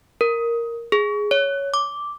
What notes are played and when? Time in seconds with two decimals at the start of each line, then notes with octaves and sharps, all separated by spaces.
0.21 A#4
0.92 G#4
1.31 C#5
1.74 D6